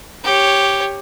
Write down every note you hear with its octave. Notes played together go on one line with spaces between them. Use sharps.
G4 C#5